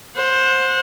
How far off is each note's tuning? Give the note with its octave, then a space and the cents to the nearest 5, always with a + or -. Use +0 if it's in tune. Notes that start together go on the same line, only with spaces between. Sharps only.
C5 +10 F#5 -25